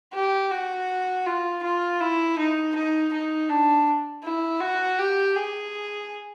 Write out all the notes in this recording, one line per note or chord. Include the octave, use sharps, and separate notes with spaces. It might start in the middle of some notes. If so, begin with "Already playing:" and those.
G4
F#4
F4
F4
E4
D#4
D#4
D#4
D4
E4
F#4
G4
G#4